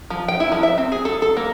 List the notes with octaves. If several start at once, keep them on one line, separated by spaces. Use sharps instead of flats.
F3
G5
E4
F3
E5
C4
G#4
A4
A4
A#3